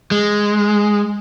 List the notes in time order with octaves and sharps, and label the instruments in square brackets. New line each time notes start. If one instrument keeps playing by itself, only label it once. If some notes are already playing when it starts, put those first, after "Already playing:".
[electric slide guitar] G#3